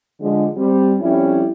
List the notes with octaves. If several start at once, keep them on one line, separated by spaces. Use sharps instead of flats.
D3 F3 G#3
G3 C4
F2 G3 C#4 E4